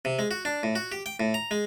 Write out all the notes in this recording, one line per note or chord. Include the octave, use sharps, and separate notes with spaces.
C3
G#3
F#4
D4
A2
F#4
G4
G5
A2
A#5
G#3